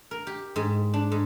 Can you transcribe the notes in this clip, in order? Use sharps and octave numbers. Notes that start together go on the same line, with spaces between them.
A#4
G4
G#2
D4
G#2